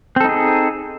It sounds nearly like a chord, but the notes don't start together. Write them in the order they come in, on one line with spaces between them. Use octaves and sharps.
C4 A4 D#4 G#4